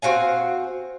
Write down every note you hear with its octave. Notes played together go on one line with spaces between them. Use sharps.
C4 F#4 F5 G#5